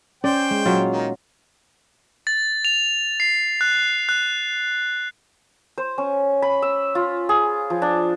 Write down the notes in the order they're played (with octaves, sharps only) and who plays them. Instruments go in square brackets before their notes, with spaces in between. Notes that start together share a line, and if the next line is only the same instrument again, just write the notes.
[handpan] C#4 [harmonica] C5 G5 [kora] D5
[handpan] G#3
[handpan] A#2 [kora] F#3 F4
[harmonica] D#3 D#4
[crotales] A6
F7
C7
F#6
F#6
[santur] C5
C#4
B5
E6
F4
G#4
F3
D4